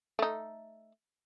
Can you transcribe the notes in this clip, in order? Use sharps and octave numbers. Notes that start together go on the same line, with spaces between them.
A3 D#4